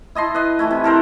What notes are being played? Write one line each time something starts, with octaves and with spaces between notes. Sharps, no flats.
E4 D#5 A5 C6
B4 D#5
E3 A3 E4
C3
A4 A#4 C5 F#5